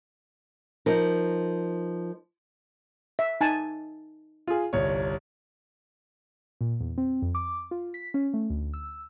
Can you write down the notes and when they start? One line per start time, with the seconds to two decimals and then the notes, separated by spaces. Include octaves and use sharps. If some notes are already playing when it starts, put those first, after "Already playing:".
0.86 F3 D#4 A#4
3.19 E5
3.41 D#4 G#5 A5
4.47 F4 G#4
4.73 G1 C2 C#5
6.61 A#2
6.80 E2
6.98 C4
7.22 F2
7.35 D6
7.71 F4
7.94 B6
8.14 C#4
8.34 A3
8.50 D2
8.74 E6